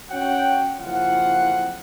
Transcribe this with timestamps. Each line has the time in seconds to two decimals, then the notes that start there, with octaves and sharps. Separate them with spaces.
0.11 C#4 F#4 C#5 F#5 G5
0.79 F#1 F2 E4 F4 F#5